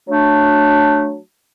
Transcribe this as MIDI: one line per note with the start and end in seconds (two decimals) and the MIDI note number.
0.08 1.17 54
0.08 1.17 57
0.08 1.17 62